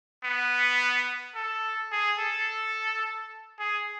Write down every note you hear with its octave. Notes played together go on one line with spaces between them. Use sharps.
B3
A4
G#4
A4
G#4